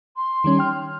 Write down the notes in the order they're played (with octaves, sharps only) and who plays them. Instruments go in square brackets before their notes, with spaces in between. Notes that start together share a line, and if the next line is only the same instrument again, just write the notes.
[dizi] C6
[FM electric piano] D#3 G3 C#4
G5 F6